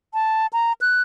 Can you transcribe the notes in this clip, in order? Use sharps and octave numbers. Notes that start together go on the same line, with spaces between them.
A5
A#5
F#6